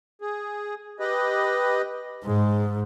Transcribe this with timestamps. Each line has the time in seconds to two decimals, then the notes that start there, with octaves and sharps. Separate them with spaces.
0.21 G#4
1.00 G4 B4 D#5
2.25 G#2 G#3